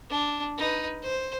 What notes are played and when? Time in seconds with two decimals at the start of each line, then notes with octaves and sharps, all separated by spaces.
0.10 D4
0.58 D#4 B4
1.02 C5